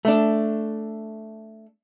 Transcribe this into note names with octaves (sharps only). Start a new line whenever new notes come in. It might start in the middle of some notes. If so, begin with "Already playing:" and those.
A3 D4